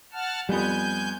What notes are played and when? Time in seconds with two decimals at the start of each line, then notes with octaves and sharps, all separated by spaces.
0.13 F#5 A5 F6
0.49 F2 G3 B3 G#5 G6